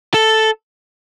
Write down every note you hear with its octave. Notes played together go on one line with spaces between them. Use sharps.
A4